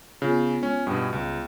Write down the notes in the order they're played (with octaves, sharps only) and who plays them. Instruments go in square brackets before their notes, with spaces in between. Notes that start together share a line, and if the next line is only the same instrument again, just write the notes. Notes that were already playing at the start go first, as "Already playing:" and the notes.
[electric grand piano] C#3 [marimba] B3 F4
[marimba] G#3 [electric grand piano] C#4
[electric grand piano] G2 B2 [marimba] G3 G5 D#6
[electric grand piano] C#2